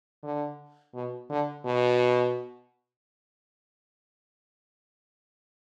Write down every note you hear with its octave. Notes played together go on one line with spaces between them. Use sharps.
D3
B2
D3
B2